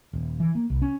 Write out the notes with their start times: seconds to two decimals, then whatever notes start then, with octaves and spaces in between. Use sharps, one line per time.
0.13 D#1
0.40 E3
0.55 A#3
0.70 C2
0.82 C#4